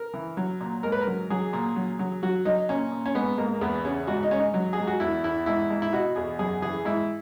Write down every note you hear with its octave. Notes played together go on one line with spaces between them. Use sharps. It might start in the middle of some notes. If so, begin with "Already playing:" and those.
Already playing: A#4
E3
F#3
A#2
G#2 A#4
B4
A#4
F#3
F#3 G#4
A#2
F#3
F#3
F#3 F#4
F#3 D#4
A#2 C#4
A#2
C#4
G#2 B3
G#2 A#3
A#3
E2 B3
C#3 C#4
G#2 F#4
D#4
G#2 C#4
D#4
F#3
G#4
G#2
F#4
E2 E4
E2 E4
G#2 E4
G#2
E4
B2 F#4
E2 G#4
F#2 G#4
E3 G#4
G#2 E4